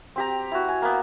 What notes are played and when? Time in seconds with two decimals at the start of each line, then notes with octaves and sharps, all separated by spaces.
0.16 C4 G4 A#5
0.52 E4 F#4
0.69 G#5
0.82 A#3 B3